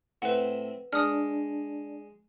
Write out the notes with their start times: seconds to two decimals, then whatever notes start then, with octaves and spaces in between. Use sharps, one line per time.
0.22 A2 C4 E4 B4 F#5
0.93 G#3 D4 D#6 F6